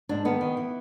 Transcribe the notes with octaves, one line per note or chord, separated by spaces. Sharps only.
G#2 D4
D#3 B3
D#3
E3